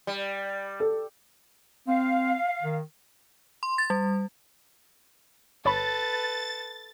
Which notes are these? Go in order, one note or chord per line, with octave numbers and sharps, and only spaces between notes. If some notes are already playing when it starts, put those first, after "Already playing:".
G3
A4
C4 F5
D#3
C6
A6
G3
G1 A4 B4 C#5 B5 A6